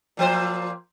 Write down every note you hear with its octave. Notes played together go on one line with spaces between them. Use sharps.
A#2 F3 C5